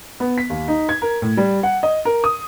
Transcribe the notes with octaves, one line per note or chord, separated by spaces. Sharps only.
B3
B6
D#2
D#4
G#6
A#4
A2
G3
F#5
D#5
A#4
D#6